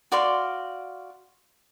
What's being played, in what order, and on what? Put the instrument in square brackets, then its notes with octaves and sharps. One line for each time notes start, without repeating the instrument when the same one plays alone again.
[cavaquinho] F#4 D5 F5 C6